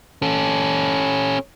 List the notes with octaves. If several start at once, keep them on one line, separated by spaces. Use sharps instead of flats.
C#4 A4